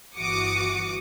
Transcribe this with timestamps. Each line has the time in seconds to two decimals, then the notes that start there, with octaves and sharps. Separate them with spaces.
0.17 G1 E3 F#4 D6 D#6 C#7